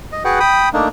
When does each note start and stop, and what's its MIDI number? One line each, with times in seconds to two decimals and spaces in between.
0.12 0.23 75
0.25 0.39 66
0.25 0.39 68
0.25 0.39 71
0.25 0.39 78
0.25 0.39 79
0.40 0.69 79
0.40 0.69 83
0.40 0.69 87
0.74 0.88 57
0.74 0.88 58
0.74 0.88 62
0.74 0.88 63